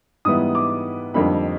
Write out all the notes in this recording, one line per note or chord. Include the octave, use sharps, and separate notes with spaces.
G#2 E3 G3 B3 E4 D#6
D6
F2 D3 G3 A#3 D#4 B5